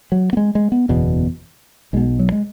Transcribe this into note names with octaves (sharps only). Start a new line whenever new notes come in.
F#3
B3
G#3
G#3
B3
F#1 E2 B2
B1 B2 G#3
F#3
G#3